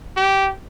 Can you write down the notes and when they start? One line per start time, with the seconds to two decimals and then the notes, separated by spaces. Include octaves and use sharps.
0.17 G4